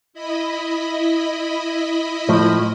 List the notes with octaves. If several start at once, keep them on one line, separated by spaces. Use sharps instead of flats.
E4 D#5 B5
A2 F3